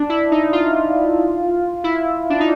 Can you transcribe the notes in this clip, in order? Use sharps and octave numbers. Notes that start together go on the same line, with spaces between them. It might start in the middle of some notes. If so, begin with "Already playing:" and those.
Already playing: D4
E4
D#4
F4
E4
D4
D#4